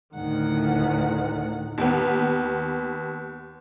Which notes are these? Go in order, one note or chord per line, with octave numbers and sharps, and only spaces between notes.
D2 A2 D#3 F#5
D#2 B3